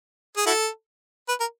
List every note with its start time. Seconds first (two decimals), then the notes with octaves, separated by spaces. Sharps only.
0.37 G#4
0.46 E4 F#4 A4
1.28 B4
1.40 A#4